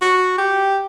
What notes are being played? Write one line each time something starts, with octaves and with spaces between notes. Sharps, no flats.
F#4
G4